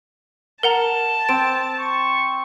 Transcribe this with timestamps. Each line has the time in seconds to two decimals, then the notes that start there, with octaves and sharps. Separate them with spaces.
0.63 A#4 F#5 A5 A#5
1.29 C4 D7
1.80 C#6